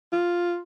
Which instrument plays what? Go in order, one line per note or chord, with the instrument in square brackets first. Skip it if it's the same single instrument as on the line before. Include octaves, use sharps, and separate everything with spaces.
[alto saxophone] F4